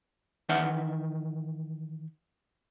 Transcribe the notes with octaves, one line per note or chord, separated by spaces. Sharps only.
D#3 E3 D#4 B4 E5 F#5